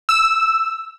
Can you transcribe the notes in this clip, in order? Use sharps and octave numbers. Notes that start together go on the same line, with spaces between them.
E6